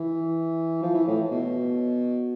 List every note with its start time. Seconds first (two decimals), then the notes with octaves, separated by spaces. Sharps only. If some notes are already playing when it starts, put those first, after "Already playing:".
Already playing: E3
0.82 F3
0.94 E3
1.07 A2
1.31 B2